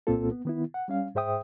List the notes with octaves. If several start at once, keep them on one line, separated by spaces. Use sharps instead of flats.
C2 A#2 A#3 C4 F4 A4
B3
D#3 B3 E4
F#5
G3 C#4 F5
G#2 G#4 C5 E5 G5 D#6